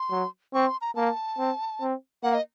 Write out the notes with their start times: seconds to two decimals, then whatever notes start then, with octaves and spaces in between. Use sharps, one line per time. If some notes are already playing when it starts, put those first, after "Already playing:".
Already playing: C6
0.11 F#3
0.53 C4 C#6
0.67 C6
0.81 A#5
0.96 A#3 A5
1.38 C4
1.81 C4
2.23 A#3 F#5
2.34 D#5